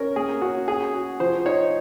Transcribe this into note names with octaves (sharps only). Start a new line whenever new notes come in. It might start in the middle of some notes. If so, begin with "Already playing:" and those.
Already playing: C#4 A#4
A#3 G#4
C#4 F#4
F#4 G#4
F#4
F3 C5
D#4 C#5